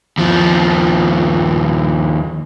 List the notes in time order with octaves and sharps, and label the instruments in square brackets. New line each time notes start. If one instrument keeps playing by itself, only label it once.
[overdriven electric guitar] D#2 F3